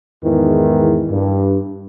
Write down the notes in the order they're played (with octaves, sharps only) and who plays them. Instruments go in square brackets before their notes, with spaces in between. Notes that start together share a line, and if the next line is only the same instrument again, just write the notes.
[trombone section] E2 G#2 D#3 E3
G2